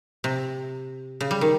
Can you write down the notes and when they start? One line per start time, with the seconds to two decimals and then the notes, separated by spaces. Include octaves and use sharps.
0.24 C3
1.21 C#3
1.31 G3
1.41 D#3